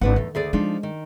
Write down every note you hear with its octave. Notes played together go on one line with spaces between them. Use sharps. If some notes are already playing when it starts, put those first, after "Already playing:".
G#1 D4 B4 F#5
E2 D#3 A3
D2 G#4 D5
F3 G#3 D4 D#4
D#3